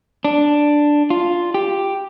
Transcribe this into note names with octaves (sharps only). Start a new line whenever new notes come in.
D4
F4
G4